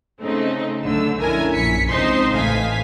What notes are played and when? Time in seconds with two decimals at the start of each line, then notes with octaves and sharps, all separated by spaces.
0.20 C#3 A3 C4 D#4
0.84 B1 D3 A3 E6
1.19 F2 C#4 D4 E4 A#4 G#5
1.54 A#1 F#2 B6 C#7
1.89 C#2 C4 D#4 C5 C6 C7
2.33 A1 E3 A3 F5 G#5 B6